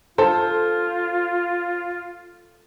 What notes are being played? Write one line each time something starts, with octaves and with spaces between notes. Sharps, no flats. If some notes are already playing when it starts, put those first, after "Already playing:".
F4 A4 C5